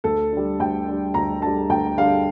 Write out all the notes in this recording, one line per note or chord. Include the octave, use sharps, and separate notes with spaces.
D2 A4
D3 G3
D2 G5
D3 G3
D2 A#5
D3 G3 A5
D2 G5
D3 G3 F5